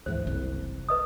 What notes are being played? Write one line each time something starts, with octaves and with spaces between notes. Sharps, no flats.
D2 G#2 E3 C5
F#1 C2
B4 D#5 D#6